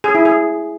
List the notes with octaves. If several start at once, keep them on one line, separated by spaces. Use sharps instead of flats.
G#4
E4
G#4